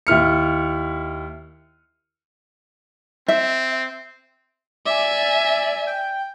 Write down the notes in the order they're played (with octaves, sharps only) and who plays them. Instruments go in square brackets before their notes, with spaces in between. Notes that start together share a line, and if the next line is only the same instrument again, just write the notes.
[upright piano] D#2 E4 F6 C#7
[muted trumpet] C4 [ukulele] E5
[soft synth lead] D5 [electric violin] E5 G#5
[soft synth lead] G5